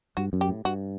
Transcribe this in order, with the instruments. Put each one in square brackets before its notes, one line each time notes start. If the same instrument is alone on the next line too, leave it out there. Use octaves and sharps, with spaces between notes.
[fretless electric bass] G2 [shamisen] F#4
[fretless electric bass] F#2
[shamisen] G4
[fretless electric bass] A2
[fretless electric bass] G2 [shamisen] F#4